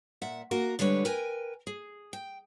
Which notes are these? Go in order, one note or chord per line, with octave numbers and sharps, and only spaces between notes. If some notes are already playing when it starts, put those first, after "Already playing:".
A#2 E5 F#5
A#3 F#4 A#4
D3 G3 G#3 B4 C#5
A#4 B4 G5 G#5
G#4
G5